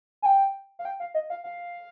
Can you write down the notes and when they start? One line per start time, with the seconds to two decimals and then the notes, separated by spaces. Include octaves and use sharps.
0.22 G#5
0.26 G5
0.79 F5
0.85 G5
1.00 F5
1.14 D#5
1.30 F5
1.44 F5